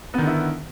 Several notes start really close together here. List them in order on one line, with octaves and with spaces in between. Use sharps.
B3 D#3 D3 E4